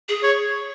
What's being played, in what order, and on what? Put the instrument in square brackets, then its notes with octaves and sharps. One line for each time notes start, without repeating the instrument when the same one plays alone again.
[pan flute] G#4
[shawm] C#5